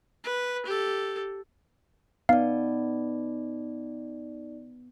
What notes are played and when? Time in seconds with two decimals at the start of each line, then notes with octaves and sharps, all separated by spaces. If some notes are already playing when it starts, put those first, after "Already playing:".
0.24 B4
0.66 G4 A4
2.29 B3 D#4 D5 F5